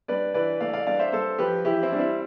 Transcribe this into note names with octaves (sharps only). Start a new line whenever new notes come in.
G2 B4 D5
E3 B4 D5
A3 D5 F5
D5 F5
G2 D5 F5
C5 E5
G2 A4 C5
F3 G4 B4
E3 E4 G4
C4 E4
G3 D4
C4 E4